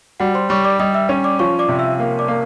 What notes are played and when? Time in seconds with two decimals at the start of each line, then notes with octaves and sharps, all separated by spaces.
0.20 G3 F#4 F#5
0.34 C5 C6
0.49 G3 C#5 C#6
0.64 D5 D6
0.80 G3 D#5 D#6
0.94 E5 E6
1.09 C#4
1.24 D5 D6
1.39 F3 C#5 C#6
1.59 D5 D6
1.69 C3
1.79 E5 E6
1.99 A#3
2.19 D5 D6
2.28 A#3